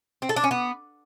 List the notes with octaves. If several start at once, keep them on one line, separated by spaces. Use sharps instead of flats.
C4
A4
D4
C#4
B3